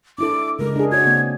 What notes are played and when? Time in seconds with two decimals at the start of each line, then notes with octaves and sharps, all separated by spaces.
0.18 D4 E4 A4 D6
0.59 C#3 G#3 A#4
0.76 D4 G#4
0.92 F#4 C#5 D5 G#6
1.05 C#3 A#3 C4